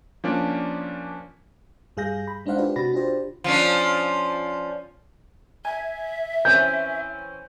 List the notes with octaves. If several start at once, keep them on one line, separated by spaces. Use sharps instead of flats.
F3 A#3 C#4 D4 D5
G2 G3 G#4 F5 G6 A#6
B5
G#3 D4 D#4 C5 F5 F#5
D4 F4 G4 B4
C3 F#4 B5 A6 A#6
D4 F4 G4 C5
F3 C#4 D4
E5 G#5
E3 C4 C#4 G6